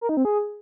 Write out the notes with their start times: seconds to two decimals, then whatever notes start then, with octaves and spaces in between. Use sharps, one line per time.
0.01 A#4
0.09 D#4
0.17 C4
0.25 G#4